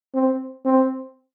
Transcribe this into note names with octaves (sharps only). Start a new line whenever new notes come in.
C4
C4